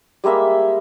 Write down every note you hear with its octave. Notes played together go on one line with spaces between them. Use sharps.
G3 G#3 A#3 E5